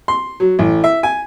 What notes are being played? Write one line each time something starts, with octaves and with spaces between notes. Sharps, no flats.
C6
F#3
A1
E5
G#5